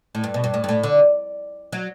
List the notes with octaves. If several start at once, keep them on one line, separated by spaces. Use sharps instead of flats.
A2
G2
B2
G2
A2
G2
A2
D3
F#3